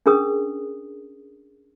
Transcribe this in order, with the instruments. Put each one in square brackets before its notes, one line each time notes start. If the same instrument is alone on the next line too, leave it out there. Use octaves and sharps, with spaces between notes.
[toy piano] C#4 D4 G#4 A#4 D#6